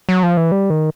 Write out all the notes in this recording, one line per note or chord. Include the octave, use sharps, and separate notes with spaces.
F#3
F3
E3
G3
D#3